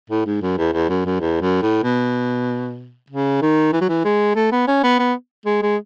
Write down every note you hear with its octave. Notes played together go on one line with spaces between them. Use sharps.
A2
G#2
F#2
E2
E2
F#2
F#2
E2
F#2
A2
B2
C#3
D#3
E3
F#3
E3
G#3
A3
B3
C#4
B3
B3
G#3
G#3